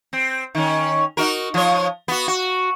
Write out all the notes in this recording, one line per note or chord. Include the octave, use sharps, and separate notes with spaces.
C4
D#3 C#4
D#4 F#4 A#4
F3 C#5
B3 F#4
F#4